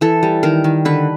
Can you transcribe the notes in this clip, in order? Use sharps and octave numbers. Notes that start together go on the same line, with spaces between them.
E3 A4
G3
D#3 A#4
D#3
D3 B4